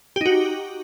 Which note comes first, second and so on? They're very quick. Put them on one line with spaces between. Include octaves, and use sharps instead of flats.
G4 D#4 F#4